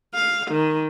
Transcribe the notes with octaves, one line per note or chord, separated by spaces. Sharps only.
F5
D#3